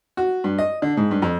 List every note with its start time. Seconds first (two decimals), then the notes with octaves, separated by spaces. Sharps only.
0.17 F#4
0.44 G2
0.58 D#5
0.82 D3
0.97 G#2
1.11 G2
1.22 F2